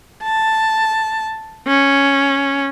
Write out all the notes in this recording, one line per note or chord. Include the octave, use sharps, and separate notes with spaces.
A5
C#4